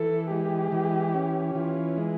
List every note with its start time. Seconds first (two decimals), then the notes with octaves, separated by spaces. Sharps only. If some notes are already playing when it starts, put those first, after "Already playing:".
Already playing: E3 A4
0.31 G#3 G4
0.72 E3
1.14 C#4
1.55 E3 F4
1.97 G#3